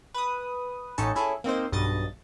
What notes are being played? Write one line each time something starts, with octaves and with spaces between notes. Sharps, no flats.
B4 D#6
A1 C#4 D#4 A4 A5 C#7
C#4 E4 G#4 A4
A#3 C4 D#4 C5
B1 G2 D#5 A6